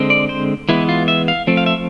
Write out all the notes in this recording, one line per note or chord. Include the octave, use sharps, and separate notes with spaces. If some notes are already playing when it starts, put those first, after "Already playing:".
Already playing: D3 G#3 C4
D5
C5
E3 G#3 B3 E4
F4
E5
F5
F3 A3 C4
F5
E5